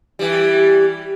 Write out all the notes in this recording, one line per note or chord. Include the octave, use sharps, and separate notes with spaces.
E3 G3